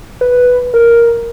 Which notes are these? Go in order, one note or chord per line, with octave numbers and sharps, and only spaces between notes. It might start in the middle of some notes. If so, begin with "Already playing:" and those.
B4
A#4